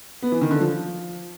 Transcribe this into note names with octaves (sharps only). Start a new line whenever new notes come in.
B3
E3
D#3
D3
F3